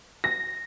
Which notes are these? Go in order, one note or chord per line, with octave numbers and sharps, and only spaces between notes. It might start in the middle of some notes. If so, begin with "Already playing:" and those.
A#6